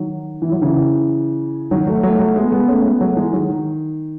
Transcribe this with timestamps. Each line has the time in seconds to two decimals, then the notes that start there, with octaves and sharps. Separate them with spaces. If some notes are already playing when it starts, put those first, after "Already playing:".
Already playing: D#3 F#3
0.42 E3
0.52 F#3
0.62 C#3 E3
1.71 D#3 F#3
1.87 F#3 A3
2.03 F#3 A3
2.19 F#3 A3
2.36 G#3 B3
2.52 G#3 B3
2.68 A3 C#4
2.84 G#3 B3
3.00 F#3 A3
3.17 E3 G#3
3.33 D#3 F#3
3.49 D#3